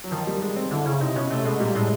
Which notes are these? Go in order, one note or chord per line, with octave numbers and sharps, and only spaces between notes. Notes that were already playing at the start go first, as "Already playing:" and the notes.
F#3
D#3 F3
G3
G#3
C4
D3 E4
C#3 E4
C3 D#4
B2 C#4
C3 A3
B2 G#3
A#2 G3
A2 G#3